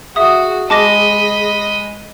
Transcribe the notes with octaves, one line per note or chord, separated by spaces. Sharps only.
F#4 G#4 E5 D#6
G#3 D#5 A5 B5 D6 A#6